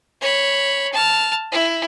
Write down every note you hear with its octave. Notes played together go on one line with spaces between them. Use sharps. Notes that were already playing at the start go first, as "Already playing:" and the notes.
C#5 B5
A5 F6
E4